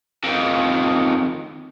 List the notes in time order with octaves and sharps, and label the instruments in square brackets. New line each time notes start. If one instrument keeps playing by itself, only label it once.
[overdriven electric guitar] F2 D#3